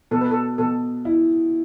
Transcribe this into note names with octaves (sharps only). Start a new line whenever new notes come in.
B2 A4
B4
A4
B2 A4
E4